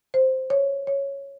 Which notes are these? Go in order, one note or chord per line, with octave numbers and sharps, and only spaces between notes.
C5
C#5
C#5